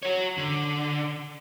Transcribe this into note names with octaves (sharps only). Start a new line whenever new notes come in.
F#4 C#5
D3